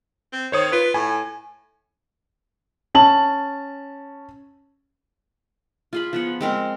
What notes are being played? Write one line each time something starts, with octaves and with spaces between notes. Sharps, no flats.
C4
D#3 C5 C#5 D#6
F4 B4
A2 G#5
C#4 A5 F#7
F4 G#4 B5
F3 B3 F#5
G#3 C4 A#4